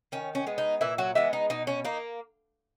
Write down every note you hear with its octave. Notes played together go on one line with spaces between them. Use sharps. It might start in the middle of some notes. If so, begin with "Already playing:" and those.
D#3 C#4
C#4
G#3 B3
D#4
A#2 E3 E4
F#3 F#4
E3 G#3 B3 E4
D#4
B2 D#4
C#4
A#3 D#4